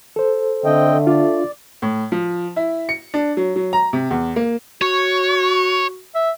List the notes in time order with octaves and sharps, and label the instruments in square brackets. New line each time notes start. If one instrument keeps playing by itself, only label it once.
[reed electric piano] A4 C5
[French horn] D3 [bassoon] A3 [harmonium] C4 D#5 G5
[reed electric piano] D4 F4 [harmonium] D5
[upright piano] A2
F3
E4
C#7
D4
F#3
F#3
A#5
C3
E2
A#3
[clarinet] F#4 [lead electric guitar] C#5
[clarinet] E5